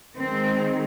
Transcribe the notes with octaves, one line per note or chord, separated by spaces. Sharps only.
D#3 G#3 C4